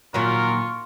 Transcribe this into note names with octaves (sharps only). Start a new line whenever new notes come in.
A#2 D#3 F#3 F4 A#4 C#6